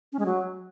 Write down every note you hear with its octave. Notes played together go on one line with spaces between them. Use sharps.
C#4
G#3
F#3